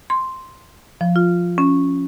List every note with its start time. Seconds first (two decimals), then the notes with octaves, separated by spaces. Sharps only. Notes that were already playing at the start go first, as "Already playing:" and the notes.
0.10 C6
1.01 F3
1.16 F4
1.58 C#4